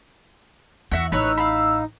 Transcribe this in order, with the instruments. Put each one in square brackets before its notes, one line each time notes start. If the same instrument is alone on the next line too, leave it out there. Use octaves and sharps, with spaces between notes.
[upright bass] E2 [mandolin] F#4 E5 F#5
[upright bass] A1 [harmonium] D#4 [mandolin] B4 C#5 F#6 [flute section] E6
[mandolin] F5 B5